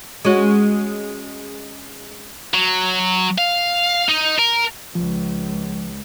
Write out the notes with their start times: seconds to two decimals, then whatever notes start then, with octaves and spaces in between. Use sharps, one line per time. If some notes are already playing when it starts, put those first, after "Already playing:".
0.25 G#3 C#4 F#4
2.54 F#3
3.38 F5
4.09 D#4
4.39 A#4
4.95 C#2 F3